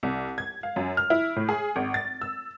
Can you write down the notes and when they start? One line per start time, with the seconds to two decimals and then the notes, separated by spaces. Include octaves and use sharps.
0.03 C2
0.38 G#6
0.63 F5
0.76 F#2
0.97 F6
1.10 E4
1.36 A2
1.49 G#4
1.76 G#1
1.94 A6
2.21 E6